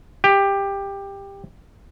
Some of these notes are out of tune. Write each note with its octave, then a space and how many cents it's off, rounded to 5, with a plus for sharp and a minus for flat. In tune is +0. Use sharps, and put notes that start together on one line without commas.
G4 +15